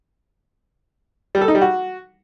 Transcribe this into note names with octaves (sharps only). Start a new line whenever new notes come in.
G3
A4
D#4
G3
F#4